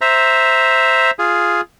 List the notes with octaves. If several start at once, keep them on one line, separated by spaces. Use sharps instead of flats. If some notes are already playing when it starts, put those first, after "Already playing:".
C5 E5 A#5
F4 G#4